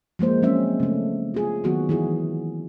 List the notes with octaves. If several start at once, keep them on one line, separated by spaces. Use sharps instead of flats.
F3 G#3 A#3 C5
F#3 G#3 C4 C#4 E5
C#3 A3
F4 G#4
D#3 F#3 B3 F#4
E3 E4 G#4